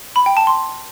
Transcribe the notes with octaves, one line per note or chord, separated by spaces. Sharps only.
B5
G5
A5
C6